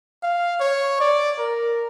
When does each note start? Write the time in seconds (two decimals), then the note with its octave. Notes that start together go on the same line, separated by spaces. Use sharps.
0.23 F5
0.60 C#5
1.00 D5
1.39 A#4